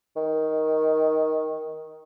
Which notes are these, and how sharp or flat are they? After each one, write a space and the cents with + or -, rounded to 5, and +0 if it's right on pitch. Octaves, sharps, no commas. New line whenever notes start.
D#3 +10